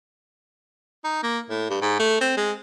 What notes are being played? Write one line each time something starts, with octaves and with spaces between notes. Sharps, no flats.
D#4
A#3
A2
G2
G#2
A3
C4
G#3